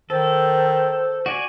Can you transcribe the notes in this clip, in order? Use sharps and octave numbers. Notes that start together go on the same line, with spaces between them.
D#3 A4 C5
F#4 D5 G#5